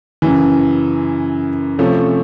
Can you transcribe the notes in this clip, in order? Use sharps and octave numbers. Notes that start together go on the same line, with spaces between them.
F#2 C#3 E3
C3 F3 A3 C#4